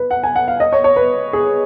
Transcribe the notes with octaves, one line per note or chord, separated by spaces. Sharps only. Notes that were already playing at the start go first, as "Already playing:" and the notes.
Already playing: B4
F#5
G#5
F#5
F5
D#5
C#5
C#5
B4
G#4